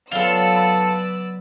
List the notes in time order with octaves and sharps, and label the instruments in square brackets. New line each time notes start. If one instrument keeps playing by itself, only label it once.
[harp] C#3 F#3 A3 [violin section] B3 D5 E6 [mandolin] F4 A4
[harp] B5 C6 F#6